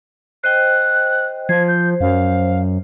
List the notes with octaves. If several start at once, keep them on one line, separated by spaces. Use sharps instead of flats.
C5 D#5 G5 F#6
F3 C5 G#6
G6
F#2 F5